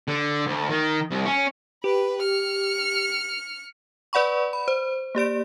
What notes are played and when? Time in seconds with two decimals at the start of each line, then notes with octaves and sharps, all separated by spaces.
0.08 D3
0.47 D2
0.69 D#3
1.11 C2
1.25 C#4
1.84 G4 B4
2.23 F6 C#7
4.13 B4 D5 F#5 B5 C#6
4.53 B5
4.68 C5
5.15 A#3 G4 D5 D7